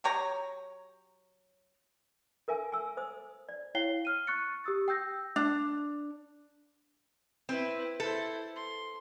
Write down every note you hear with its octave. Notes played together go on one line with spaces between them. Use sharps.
F#3 G4 C#5 A#5
A4 A#4 E5 G#5
G#5 E6
C5 D#6
D5
E4 C#5 F5 G5 C7 G7
F6 D#7
C#6 F#6 A6 C#7
G4 D#6 E6 A6
G5 E6 G6 A#6
D4
C4 E4 B4
E4 A4 C5
C6